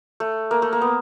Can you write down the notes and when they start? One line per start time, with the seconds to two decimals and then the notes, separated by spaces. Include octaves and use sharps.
0.20 A3
0.51 A#3
0.62 A3
0.73 A#3
0.82 B3